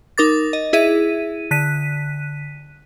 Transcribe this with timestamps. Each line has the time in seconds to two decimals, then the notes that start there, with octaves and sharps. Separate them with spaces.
0.18 D#4 A#4 D6 A6
0.53 D#5
0.73 E4 G#4 E5 D#7
1.51 D3 F#6 B6 D#7